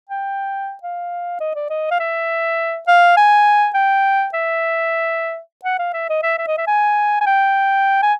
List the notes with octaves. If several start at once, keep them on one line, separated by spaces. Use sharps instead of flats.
G5
F5
D#5
D5
D#5
F5
E5
F5
G#5
G5
E5
F#5
F5
E5
D#5
E5
E5
D#5
E5
G#5
G#5
G5
G#5